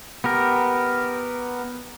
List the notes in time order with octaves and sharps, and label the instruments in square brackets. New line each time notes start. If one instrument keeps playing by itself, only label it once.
[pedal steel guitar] B3 G4 A#4